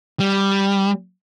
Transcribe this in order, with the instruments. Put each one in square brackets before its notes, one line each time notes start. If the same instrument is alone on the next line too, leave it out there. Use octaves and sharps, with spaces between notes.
[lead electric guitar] G3